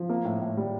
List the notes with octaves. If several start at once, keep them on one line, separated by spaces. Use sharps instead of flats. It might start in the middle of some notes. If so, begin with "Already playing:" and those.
Already playing: F3
A#3
A2
A2
G3